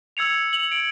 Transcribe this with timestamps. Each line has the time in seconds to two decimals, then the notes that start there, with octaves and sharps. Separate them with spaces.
0.17 E6 G#6 C#7 F7
0.53 F7 F#7
0.72 D7